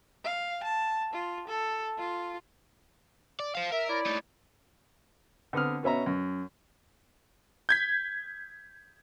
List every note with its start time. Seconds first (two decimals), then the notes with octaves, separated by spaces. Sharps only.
0.24 F5
0.64 A5
1.13 F4
1.48 A4
1.98 F4
3.39 D5
3.55 C5 F5
3.72 A#4 E5
3.89 E4 C#5 D5
4.06 A2 D#4
5.53 D3 B3 C4 D#6 F6
5.83 B2 B3 C#4 E5 A#5
6.06 F#2
7.69 G6 G#6 B6